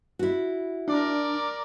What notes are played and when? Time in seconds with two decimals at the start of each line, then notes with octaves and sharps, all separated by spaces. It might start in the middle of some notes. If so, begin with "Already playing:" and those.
0.19 E4 F#4
0.88 D4 A#4 D5